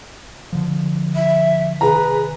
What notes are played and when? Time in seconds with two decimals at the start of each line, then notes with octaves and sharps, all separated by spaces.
0.52 D3 F3
1.15 E5
1.81 C3 D#3 G#4 B4 A#5